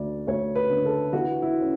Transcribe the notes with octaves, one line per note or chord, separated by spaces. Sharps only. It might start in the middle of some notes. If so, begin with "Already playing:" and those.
Already playing: D2 D3 D5
D2 C#5
B4
D3
A4
E3 F#4
E4
C#4